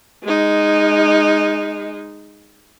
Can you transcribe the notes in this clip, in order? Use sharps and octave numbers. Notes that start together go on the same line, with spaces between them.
G#3 D#4